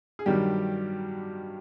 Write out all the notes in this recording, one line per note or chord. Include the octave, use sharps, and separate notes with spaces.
G#4
G2 D#3 F#3 G3 G4